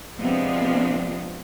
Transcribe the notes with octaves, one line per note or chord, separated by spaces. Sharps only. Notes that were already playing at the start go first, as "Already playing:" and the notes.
C3 F3 G#3 B3 C4 D4